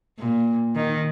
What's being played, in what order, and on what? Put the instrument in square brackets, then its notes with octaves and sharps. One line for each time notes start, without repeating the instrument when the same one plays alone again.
[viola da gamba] A#2
D#3